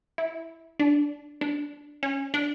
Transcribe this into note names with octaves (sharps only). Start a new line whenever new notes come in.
E4
D4
D4
C#4
D4